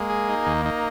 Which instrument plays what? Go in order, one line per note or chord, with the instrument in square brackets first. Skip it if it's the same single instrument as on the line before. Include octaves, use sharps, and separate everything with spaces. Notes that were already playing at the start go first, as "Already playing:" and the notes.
Already playing: [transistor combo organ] G#3 [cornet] A#3
[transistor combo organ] G#4
D#4
D#2
D#4